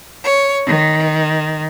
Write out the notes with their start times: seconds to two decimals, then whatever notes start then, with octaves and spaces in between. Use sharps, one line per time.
0.23 C#5
0.66 D#3